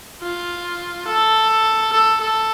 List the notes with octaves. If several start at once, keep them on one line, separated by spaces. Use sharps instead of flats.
F4
A4
A4
A4